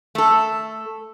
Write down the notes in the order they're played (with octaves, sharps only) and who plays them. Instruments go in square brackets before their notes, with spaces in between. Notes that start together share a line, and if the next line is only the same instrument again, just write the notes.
[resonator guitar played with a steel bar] A3 A4